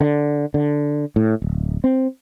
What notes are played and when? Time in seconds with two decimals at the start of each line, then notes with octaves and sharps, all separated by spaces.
0.01 D3
0.54 D3
1.16 A2
1.42 D1
1.84 C4